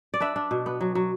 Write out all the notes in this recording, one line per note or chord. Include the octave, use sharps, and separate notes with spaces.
D5
D4 B4 E5
D4
B2
B3
F#3
F#3